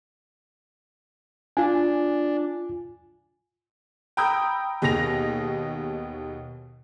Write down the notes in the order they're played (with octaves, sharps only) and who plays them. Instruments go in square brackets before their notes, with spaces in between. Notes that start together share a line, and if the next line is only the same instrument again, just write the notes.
[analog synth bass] D4 [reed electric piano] F4 G#5
[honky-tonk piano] G5 A#5 B5 D#6 E6 G6
D#2 B2 G#4 A#6 F7